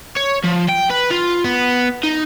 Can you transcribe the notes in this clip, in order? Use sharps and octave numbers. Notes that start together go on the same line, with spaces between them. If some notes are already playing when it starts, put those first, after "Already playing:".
C#5
F3
G5
B4
F4
B3
D#4